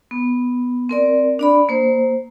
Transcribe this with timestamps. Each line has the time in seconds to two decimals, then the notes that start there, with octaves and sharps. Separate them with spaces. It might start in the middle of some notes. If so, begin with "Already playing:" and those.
0.11 B3
0.89 C4 A#4 D5
1.39 D4 D5 B5
1.69 A#3 C5